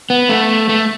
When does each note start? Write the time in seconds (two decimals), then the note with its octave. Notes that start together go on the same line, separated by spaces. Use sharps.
0.10 B3
0.29 A3
0.69 A3